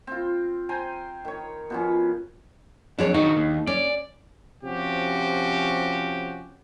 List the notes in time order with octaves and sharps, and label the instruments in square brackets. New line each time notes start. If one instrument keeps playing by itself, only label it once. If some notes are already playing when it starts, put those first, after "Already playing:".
[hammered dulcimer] C4 F4
C5 G5 G#5 A#5
D#3 C#5
B2 F3 C#4
[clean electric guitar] F2 [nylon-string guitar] D4 G#4 C#5
[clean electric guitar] D#3 F#4 [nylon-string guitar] D#4
[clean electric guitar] D#2
[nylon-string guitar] C#4 [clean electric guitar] D5
[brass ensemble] C3 F3 C#4 F#4 G4